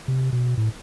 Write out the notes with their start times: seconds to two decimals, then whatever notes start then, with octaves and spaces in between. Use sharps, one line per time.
0.08 C3
0.33 B2
0.57 A2